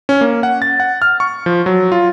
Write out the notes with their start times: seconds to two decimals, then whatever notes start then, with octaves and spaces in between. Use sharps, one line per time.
0.09 C#4
0.21 A#3
0.43 F#5
0.62 A6
0.80 F#5
1.02 F6
1.20 C#6
1.46 F3
1.66 F#3
1.92 F4